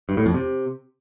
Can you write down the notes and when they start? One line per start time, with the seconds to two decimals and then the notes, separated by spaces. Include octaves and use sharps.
0.09 G2
0.17 A2
0.26 F2
0.34 C3